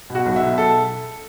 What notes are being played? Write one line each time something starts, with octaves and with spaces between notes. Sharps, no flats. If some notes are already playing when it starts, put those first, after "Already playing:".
B2
F#4
B1
E5
B2
A4